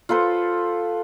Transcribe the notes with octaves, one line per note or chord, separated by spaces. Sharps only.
F4 A4 B4 C5